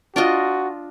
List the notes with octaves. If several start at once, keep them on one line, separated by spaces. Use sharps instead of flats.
D4 F4 F#4 D#5